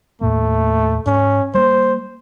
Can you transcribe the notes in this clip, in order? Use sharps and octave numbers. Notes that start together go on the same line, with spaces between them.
D#2 A2 A3 A#3
G#2 C#4
G3 A#3 C5